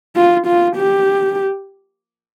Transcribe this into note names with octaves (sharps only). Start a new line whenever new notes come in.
F4
F4
G4